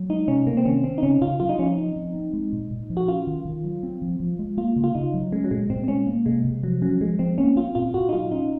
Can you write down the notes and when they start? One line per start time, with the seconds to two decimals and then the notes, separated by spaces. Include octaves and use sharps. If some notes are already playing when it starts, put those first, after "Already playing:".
Already playing: F#3
0.09 G#3 D#4
0.28 C3 C#4
0.46 C3 A#3
0.57 C4
0.65 D#3 C#4
0.84 C4 C#4
0.98 D#4
1.03 C#3 C#4
1.21 C#3 F4
1.40 F#3 F4
1.49 D#4
1.59 F3 C#4
1.67 D#4
1.77 C4
1.96 F3
2.15 C4
2.33 G#3
2.53 A#2
2.71 A#2
2.90 F3
2.97 F#4
3.08 C#4 F4
3.27 D#3
3.45 D#3
3.64 F#3
3.83 C4
4.02 F3
4.20 F3
4.39 G#3
4.57 A#3 F4
4.76 C#3
4.84 F4
4.95 C#3 D#4
5.14 F#3
5.32 G#3 C#4
5.44 F#3
5.51 A#2 G#3
5.70 A#2 C4
5.84 C4
5.88 G#3 C#4
6.07 A#3
6.26 C3 G#3
6.45 C3
6.63 F3 F#3
6.82 F#3 C#4
7.01 F3 G#3
7.19 F3 C4
7.38 A#3 C#4
7.56 C4 F4
7.75 A#2 F4
7.94 A#2 F#4
8.09 D#4
8.13 F#3 F4
8.31 C#4 D#4